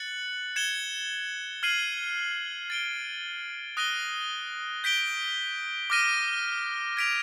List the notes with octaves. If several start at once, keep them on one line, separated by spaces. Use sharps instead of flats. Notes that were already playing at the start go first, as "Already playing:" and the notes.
Already playing: F#6 A6 C#7 F#7
G#6 C#7 E7 G7
F6 G#6 C7 D#7 F#7
A6 D7 G7
D#6 F#6 A#6 D#7 G7
G6 B6 D7 G7
D6 F6 A#6 D#7
G#6 B6 D7 F7